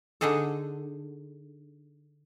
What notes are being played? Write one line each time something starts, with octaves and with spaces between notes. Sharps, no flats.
D3 D4 D#4 G#4 A4